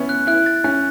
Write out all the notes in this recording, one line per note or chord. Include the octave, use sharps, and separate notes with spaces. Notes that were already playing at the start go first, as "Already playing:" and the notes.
Already playing: B3 C#4 E4
F#6
E4 F#6
A6
C#4 F#6